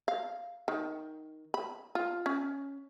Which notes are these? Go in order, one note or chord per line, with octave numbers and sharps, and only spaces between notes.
F5
D#3
B5
F4
C#4